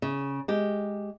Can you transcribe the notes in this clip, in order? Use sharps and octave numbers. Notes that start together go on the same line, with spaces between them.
C#3
G#3 G4